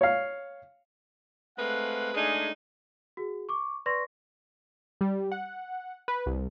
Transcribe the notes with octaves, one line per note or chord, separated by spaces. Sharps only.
C#5 F5
G#3 A3 C4 B4 F5 F#5
G#3 A3 D4 D#4 G#4
F#4 G#4
C#6 D6
B4 D5 C6 C#6 A#6
G3
F#5
B4
C2